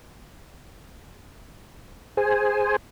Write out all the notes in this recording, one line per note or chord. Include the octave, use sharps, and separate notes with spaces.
G#4 C5 G#5